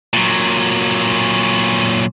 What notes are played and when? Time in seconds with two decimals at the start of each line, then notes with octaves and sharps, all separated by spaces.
0.13 A#2 F#3